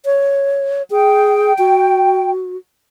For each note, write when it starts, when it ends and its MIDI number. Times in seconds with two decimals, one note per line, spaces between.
0.05 0.83 73
0.90 1.53 68
0.90 2.30 79
1.59 2.57 66